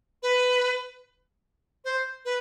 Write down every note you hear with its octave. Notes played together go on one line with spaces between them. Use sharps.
B4
C5
B4